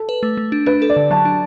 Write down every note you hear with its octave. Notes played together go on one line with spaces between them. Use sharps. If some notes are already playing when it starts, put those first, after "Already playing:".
Already playing: A4
B4
A3
A3
D4
D4 B4
A4
D5
D3
F#3 A5
D4